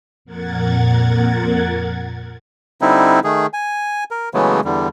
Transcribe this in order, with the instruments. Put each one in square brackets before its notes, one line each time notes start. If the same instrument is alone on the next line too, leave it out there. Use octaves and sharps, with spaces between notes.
[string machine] F2 A#2 A#4 F#5 G#6 A6
[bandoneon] D3 G3 C4 D#4 E4
D#3 A3 G#4
G#5
A#4
C#3 E3 F#3 G#3 A3 B3
E2 D3 G3